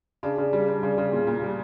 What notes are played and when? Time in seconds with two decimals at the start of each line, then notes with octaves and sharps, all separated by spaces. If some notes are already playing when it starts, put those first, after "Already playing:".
0.23 C#3 D4
0.38 C#3
0.53 G3
0.68 G3 D4
0.83 C#3
0.98 C#3
1.12 A#2
1.27 A#2
1.42 G3